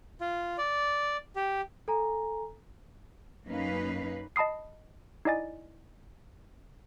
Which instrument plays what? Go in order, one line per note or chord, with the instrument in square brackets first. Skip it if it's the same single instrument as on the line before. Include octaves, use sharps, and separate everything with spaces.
[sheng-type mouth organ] F4
D5
G4
[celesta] A4 G#5 A#5
[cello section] F#2 A#3 C#4 D#4 B4 F5
[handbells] D#5 A5 B5 D#6 C7
D#4 E4 D5 D#5 G#5 A6